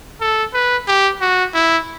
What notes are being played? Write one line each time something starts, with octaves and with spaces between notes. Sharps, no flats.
A4
B4
G4
F#4
E4